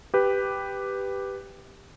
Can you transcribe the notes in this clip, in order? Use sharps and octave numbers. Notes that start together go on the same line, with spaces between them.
G4 B4